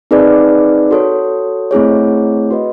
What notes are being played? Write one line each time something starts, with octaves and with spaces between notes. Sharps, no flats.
C4 D#4 G#4 B4 D5
F#4 A4 C#5
A3 C4 E4 G#4 C#5
F#4 B4 D#5